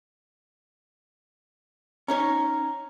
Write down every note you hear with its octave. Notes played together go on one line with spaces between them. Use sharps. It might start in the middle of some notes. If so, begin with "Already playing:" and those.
C#4 D#4 C#5 A#5